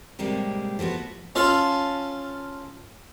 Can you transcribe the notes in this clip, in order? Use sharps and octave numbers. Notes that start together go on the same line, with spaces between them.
A2 C3 G3 G#3 A#3 G4
F3 A3 B3 F#4
C#4 F4 A4 F5 A5